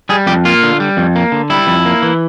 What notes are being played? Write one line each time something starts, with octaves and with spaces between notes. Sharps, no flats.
G3 G#4
F2 G4
A#3 F4
D3
G3
F2
A#3
D3
G3 E4
F2
A#3
E3